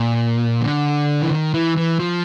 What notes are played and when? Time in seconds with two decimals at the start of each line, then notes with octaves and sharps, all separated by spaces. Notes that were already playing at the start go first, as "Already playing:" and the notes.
Already playing: A#2
0.61 D3
1.22 E3
1.31 D#3
1.54 E3
1.76 E3
2.00 F3